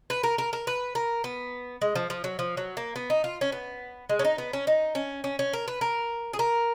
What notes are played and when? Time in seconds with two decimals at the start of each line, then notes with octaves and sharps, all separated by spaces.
0.10 B4
0.23 A#4
0.38 A#4
0.53 A#4
0.67 B4
0.95 A#4
1.24 B3
1.82 G#3
1.95 F3
2.10 F3
2.24 F#3
2.39 F3
2.57 F#3
2.77 A#3
2.96 B3
3.10 D#4
3.24 F4
3.41 C#4
3.52 B3
4.09 G#3
4.19 C#4
4.25 D#4
4.38 B3
4.53 C#4
4.67 D#4
4.95 C#4
5.24 C#4
5.39 C#4
5.53 A#4
5.68 B4
5.81 A#4
6.33 G#4
6.39 A#4